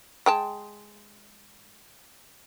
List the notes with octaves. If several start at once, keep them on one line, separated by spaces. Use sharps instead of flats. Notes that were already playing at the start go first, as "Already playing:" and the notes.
G#3 G5 A5